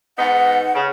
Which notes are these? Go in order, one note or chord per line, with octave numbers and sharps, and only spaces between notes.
G#2 B3 D#4 F#5
C#3